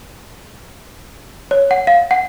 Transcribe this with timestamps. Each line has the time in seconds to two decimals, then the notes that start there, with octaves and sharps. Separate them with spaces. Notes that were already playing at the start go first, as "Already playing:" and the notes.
1.51 C#5
1.71 F#5
1.87 F5
2.11 F#5